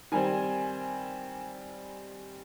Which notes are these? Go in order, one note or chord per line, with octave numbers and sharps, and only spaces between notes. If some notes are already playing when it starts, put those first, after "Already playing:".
D#3 G3 C4 G#5